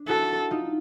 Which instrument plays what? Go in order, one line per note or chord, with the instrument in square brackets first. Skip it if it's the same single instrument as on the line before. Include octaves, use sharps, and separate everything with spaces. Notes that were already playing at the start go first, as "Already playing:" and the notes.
Already playing: [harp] D4
[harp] E4 F#4 [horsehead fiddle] A4
[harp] D#4 F4